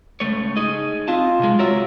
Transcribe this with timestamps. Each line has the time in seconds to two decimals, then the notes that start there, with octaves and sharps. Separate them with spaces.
0.20 C#2 A3 C#5
0.57 D#4 G#4 D#5
1.08 C4 F4 A5
1.39 C3 G#3
1.59 F#3 F4 A#4 E5